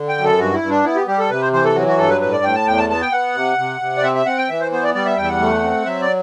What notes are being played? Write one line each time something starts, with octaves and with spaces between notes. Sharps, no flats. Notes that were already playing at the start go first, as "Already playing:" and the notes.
Already playing: D3
G5
F#2
A4
G2 F#4
E4
G2
D4
B3 E4
G4
G3 G4
A4
C3 B4
C5
E3 C5
A4
F#3 F#4
F#4
G2 A4
B4
A2 B4
D5
A2 G5
A5
E2 G5
A5
B3 A5
G5
B3 F#5
C3
C3
C3
D5
C4 E5
E5
C4 F#5
G5
E3 E5
C5
B3 C5
D5
G3 D5
E5
E2 G5
E5
F#5
A3
C4
F#3 E5
D5